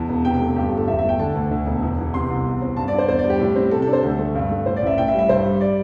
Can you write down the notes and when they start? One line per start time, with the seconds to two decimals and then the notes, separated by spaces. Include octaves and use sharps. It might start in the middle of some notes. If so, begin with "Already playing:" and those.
Already playing: E2 A5
0.09 E1
0.24 C3 G5
0.40 A3
0.56 G2 G4
0.67 A4
0.72 G1
0.77 A4
0.88 E2 E5
0.99 E5
1.03 A3
1.09 G5
1.19 D3 A5
1.35 D2
1.51 D2
1.67 E1
1.82 E2
1.98 E3
2.14 C3 C6
2.30 C2
2.46 E2
2.62 C4
2.76 G2 A5
2.88 D5
2.92 D4
2.98 C5
3.08 E2 C5
3.19 D5
3.25 G3
3.30 G4
3.40 A2
3.56 C4
3.71 C3 A4
3.82 A4
3.87 D4
3.93 C5
4.03 D2 A4
4.19 A3
4.35 G2
4.51 A3
4.66 A2 C5
4.77 D5
4.82 A1 E5
4.98 A2 G5
5.08 E5
5.13 G3
5.19 E5
5.29 G2 C5
5.45 G3
5.61 D5